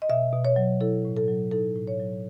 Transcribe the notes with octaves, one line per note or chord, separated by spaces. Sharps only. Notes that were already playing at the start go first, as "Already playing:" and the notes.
D#5
B2 E5
B2
C#5
F#3
E4 A4
A2
A4
F#3
D#4 A4
A2
C#5
F#3